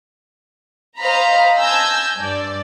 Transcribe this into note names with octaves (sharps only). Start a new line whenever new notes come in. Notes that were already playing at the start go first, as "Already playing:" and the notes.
C5 D#5 F5 A#5 B5
G#5 A5 E6 G6 A#6
G2 D5